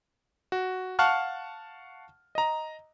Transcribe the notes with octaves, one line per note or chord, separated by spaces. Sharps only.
F#4
F5 F#5 A5 C#6 F6 F#6
D#5 A#5